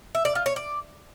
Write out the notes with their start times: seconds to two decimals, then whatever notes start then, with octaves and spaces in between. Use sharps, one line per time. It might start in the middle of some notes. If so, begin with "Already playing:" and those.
0.15 E5
0.25 D5
0.35 F4
0.46 C#5
0.56 D5